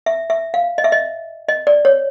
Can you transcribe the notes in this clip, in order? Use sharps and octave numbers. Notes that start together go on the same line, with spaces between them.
E5
E5
F5
D#5
E5
D#5
D#5
D5
C#5